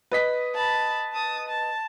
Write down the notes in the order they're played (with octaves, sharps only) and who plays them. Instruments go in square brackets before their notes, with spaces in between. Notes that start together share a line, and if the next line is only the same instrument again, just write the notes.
[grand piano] B4 D#5 B6
[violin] A5 B5
A5 D#6
A5